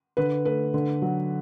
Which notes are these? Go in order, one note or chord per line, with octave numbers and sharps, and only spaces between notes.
D3 B4
A3 B4
D3
F#3